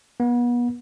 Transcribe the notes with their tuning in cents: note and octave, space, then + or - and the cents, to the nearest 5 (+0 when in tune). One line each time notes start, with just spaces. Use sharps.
B3 -35